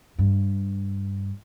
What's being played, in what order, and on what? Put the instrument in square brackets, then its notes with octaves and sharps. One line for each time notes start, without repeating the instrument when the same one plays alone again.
[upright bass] G2